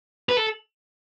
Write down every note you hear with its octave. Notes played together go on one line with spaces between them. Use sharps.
B4
A4